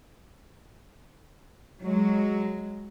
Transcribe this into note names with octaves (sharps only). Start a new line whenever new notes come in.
F#3 G#3